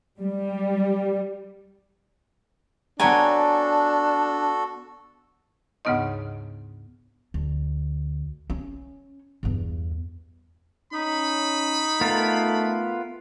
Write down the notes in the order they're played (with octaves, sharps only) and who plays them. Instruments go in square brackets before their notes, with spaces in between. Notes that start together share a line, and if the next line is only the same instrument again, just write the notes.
[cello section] G3
[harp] B3 A#5 [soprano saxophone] D4 [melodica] F#4 A4 [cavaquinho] C#5 G5 G#5
[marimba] D2 G#2 C#3 B3 D#4 D#5
[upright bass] D2
C#4
E2 G2
[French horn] C#4 [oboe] D#4 [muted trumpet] B5
[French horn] A3 [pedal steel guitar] B3 F4 A#4